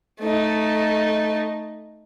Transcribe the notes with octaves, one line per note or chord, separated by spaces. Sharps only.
A3 D#4